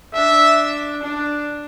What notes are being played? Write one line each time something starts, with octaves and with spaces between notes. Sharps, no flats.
D4 E5
D4